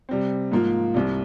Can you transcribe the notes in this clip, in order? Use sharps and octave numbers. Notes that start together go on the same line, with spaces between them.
C3 G3 C4
G#2 F3 A#3 F4
C2 C3 G3